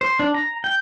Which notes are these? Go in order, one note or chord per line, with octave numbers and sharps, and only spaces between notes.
C5
D4
A#5
G5